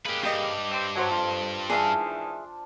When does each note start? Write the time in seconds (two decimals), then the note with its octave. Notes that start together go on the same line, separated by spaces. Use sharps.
0.05 C#3 G#3 A#3 G4 B4
0.23 G2 G4 D#5
0.71 C4
0.95 F#3 C5 G5 A5
1.11 F2 F4
1.70 G#2 D#3 E3 D4 G#4 E5 F5